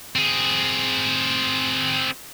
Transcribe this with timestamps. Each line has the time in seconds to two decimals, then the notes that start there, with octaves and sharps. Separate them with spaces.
0.16 C4 G#4